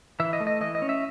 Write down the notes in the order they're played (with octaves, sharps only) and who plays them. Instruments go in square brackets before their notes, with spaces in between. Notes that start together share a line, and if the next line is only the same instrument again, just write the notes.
[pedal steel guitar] E3 E5
D#5
A3
D#5
E3 D#5
D#5
C#4
E5